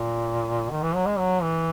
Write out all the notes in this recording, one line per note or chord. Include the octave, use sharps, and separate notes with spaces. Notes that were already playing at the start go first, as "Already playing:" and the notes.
Already playing: A#2
D#3
E3
F#3
G#3
F#3
E3